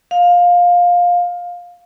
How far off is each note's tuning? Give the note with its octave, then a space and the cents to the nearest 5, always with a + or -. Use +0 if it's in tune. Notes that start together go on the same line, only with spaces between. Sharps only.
F5 +15